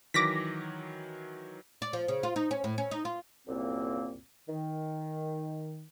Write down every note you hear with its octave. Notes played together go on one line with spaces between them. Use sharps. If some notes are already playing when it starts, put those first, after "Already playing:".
D#3 E3 F#3 D6 A#6 B6
D5
F3
C#3
F4
D#4
C#4
A2
C#4
D#4
F4
C2 F#2 A#2 A#3 C4
D#3